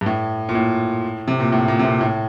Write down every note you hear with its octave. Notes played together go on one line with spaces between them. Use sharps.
G2
A2
A#2
A2
C3
A#2
A2
A#2
C3
A#2
A2